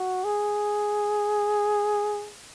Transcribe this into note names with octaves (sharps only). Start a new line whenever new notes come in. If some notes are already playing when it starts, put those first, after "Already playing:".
Already playing: F#4
G#4